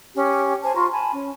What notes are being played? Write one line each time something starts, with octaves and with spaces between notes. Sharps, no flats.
C#4 G4
C5 G#5 A5
F4 A#5 C6 C#6
G#5 A5 B5
C#4